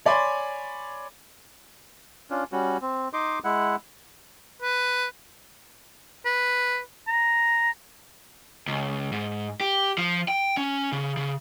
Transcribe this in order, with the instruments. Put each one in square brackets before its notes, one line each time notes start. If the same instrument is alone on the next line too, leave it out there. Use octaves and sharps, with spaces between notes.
[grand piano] C#5 D5 G#5 B5 C6
[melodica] C#4 D4 F4
G3 C#4 F#4
C4
D#4 D#5 C6 D6
G#3 E4 F#5
[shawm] B4
B4
A#5
[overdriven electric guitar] C#2
G#2
G4
F3
G5
C#4
C#3
C#3